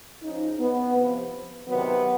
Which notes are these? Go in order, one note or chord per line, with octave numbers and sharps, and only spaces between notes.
C#3 F3 D#4
B3
C3 F3
C3 D#3 F#3 B3